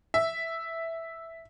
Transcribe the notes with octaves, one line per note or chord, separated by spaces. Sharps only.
E5